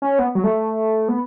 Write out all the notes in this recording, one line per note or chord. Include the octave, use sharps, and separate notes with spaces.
C#4
B3
F#3
A3
B3